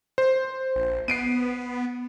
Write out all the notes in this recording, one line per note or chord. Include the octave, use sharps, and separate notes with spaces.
C5
A#1
B3 C7 D7 D#7